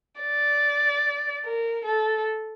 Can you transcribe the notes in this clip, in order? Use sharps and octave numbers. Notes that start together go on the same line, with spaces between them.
D5
A#4
A4